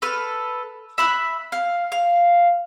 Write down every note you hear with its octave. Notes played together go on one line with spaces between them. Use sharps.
A4 B4 F6
E5 B5 F#6
F5
F5